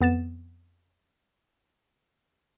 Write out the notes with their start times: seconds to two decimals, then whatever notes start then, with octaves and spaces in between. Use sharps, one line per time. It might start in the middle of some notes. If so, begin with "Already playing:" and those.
0.01 F2 B3 A6 E7